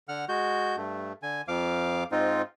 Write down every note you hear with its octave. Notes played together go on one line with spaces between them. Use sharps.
D3 F#5 F6
G#3 F#4 G6
G2 A3
D3 G#5
F2 F3 F5 D6
G#2 C4 D#4 F4